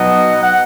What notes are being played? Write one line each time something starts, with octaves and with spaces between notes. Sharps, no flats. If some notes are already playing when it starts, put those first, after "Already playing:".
Already playing: B2 F#3 B3 D#4 D#5 F#5
F#5